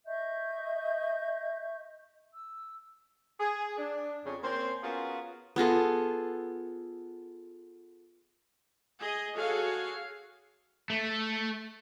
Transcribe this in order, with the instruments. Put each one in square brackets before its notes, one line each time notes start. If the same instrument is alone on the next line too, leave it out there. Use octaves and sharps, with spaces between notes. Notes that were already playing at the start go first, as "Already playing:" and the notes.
[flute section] D#5 E5 C#6 G6
E6
[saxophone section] G#4
D4
F2 C#3
A#3 C4 C#4 C5
B3 C#4 F4 F#4 G#4 A#4
[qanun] B3 F4 G#4 A4
[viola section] G#4 D#5
F#4 G#4 A4 C#5 F5
[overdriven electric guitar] A3